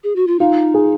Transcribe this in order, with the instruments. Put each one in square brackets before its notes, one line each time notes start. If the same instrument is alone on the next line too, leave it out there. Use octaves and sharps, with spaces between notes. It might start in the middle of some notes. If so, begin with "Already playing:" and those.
[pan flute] G#4
F#4
F4
[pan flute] D#4 [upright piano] F4
[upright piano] G#4